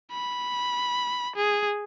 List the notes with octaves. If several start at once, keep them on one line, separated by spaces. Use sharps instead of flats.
B5
G#4